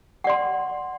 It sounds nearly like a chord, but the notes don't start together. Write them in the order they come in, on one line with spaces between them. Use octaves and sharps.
F#5 D5 C6